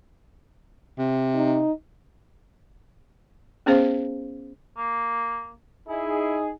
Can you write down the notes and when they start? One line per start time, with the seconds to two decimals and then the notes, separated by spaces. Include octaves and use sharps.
0.99 C3
1.35 D#4
3.66 B3 C#4 G#4 C5 F5
4.77 A#3
5.88 D#4 E4 G#4